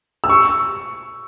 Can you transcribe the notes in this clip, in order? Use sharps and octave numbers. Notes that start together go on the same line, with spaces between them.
E6
C#6